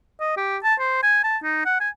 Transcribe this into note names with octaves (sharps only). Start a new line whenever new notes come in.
D#5
G4
A5
C5
G#5
A5
D#4
F#5
G#5